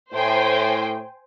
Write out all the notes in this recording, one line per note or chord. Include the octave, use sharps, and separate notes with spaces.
A2 C5 G5 G#5